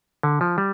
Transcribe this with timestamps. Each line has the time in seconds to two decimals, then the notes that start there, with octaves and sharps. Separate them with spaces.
0.23 D3
0.41 F3
0.58 G3